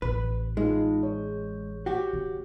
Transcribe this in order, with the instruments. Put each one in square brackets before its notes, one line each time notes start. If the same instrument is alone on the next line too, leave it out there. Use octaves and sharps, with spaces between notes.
[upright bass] A1 [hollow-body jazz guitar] B4
[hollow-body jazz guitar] G#3 [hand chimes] D#4 F4
[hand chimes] C#5
[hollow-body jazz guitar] F#4 G4
[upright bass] A#3